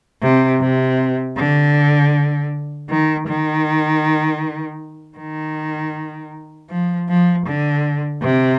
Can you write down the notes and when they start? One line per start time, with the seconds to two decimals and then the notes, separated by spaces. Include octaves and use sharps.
0.22 C3
0.61 C3
1.37 D3
2.89 D#3
3.27 D#3
5.18 D#3
6.70 F3
7.09 F3
7.46 D3
8.22 C3